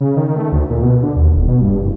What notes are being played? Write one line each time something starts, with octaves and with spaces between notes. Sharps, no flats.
C#3
D#3
A3
D2
A#2
B2
D3
D#2
E1
B2
G2
F#1